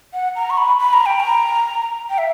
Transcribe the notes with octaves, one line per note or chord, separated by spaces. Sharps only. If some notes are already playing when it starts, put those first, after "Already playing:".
F#5
A#5
C#6
B5
B5
A#5
G5
A#5
G5
E5